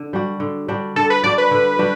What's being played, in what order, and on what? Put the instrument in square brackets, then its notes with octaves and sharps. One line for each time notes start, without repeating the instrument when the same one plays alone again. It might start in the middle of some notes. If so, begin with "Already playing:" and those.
Already playing: [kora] D3
G3 D4 F#4
D3
G3 D4 F#4
[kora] D3 [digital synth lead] A4
[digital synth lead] B4
[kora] G3 D4 F#4 [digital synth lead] D5
[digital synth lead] B4
[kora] D3
G3 D4 F#4